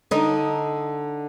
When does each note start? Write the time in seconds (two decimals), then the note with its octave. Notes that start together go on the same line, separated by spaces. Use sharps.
0.11 D3 D#4